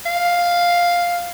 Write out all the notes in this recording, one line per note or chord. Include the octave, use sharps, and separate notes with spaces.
F5